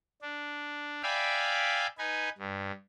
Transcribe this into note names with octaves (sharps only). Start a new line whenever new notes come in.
D4
D5 E5 F5 G5 G#5 B5
D#4 B4 G#5
G2